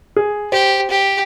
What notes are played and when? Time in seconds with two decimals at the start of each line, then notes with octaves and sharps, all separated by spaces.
0.16 G#4
0.52 G4 C5
0.91 G4